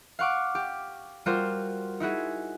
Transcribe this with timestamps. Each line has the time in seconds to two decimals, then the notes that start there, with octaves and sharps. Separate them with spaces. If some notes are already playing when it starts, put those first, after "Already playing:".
0.19 F5 F#5 C#6 D6
0.55 G4
1.26 G3 F4 F#4 A#4 C5
2.00 D#4 E4 F#4 G#4